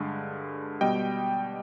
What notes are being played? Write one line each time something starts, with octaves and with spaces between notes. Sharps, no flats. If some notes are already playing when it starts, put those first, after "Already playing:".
Already playing: G2 D3 G#3
B2 G3 D#5 G5